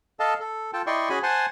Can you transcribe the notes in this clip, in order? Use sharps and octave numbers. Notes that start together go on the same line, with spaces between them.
A4 D#5 F5 A5
A4
F4 A4 G5 A5
E4 D5 D#5 G5 C6 C#6
C#4 F#4 G#4 G#5 B5
C5 F#5 G#5 A5 C6